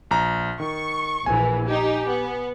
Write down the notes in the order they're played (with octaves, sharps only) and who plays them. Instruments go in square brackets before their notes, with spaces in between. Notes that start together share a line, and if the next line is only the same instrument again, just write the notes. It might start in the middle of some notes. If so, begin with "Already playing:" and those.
[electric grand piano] A#1 A#5
[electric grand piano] D#3 [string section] C#6
[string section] A#1 E3 [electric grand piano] G#5
[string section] D#4 G4
B3